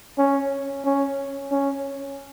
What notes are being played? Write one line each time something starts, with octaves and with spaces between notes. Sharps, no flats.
C#4
C#4
C#4